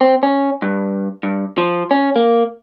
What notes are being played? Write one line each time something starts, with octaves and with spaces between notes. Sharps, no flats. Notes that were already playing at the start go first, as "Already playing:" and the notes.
C4
C#4
G2
G2
F3
C#4
A#3